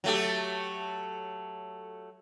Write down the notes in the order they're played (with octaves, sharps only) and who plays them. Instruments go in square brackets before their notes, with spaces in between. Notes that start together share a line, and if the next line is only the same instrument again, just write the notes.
[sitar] F#3 A3 G4